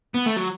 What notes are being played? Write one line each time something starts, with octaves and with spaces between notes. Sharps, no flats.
B3
A3
F#3